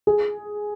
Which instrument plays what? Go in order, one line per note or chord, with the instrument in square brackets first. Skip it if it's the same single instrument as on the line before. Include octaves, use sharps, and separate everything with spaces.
[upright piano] G#4